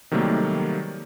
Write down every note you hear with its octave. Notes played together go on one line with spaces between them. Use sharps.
C3 D#3 F#3 G3 A3 A#3